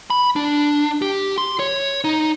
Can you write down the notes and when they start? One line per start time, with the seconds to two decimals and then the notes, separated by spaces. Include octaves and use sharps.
0.10 B5
0.36 D4
1.02 G4
1.38 C6
1.59 C#5
2.04 D#4